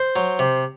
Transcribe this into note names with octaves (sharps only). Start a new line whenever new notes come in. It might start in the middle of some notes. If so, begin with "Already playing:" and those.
Already playing: C5
F#3
C3